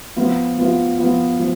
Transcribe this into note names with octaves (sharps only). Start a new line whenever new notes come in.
F3 B3 F4
F3 B3 F4
F3 B3 F4
F3